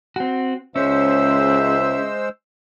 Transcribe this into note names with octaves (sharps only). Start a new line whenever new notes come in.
C4 F#4
C#2 G#3 C#4 C5 E5 E6